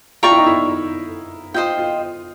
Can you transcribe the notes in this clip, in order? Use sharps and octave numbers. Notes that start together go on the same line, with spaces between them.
F4 D5 G5 A#5 C#6
E4
D#4
E4
F4 C5 D#5 G5
F4